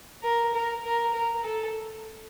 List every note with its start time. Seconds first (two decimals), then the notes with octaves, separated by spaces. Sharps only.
0.23 A#4
0.54 A#4
0.84 A#4
1.13 A#4
1.43 A4